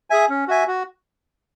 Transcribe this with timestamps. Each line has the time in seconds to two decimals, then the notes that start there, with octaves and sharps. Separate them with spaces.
0.10 G#4 E5 G#5
0.29 C#4
0.48 F#4 E5 G#5
0.68 F#4